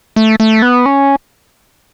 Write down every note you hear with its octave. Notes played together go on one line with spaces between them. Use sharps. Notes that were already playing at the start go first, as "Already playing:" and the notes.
A3
A3
B3
C#4